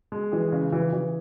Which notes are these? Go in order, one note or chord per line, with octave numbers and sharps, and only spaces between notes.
G#3
E3 G#4
C#3
E3
E3